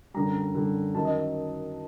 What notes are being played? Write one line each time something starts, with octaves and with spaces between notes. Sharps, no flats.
F#2 D3 G3 A#5
F#2 D3 G3
F#2 D#3 F#3 A5
D#5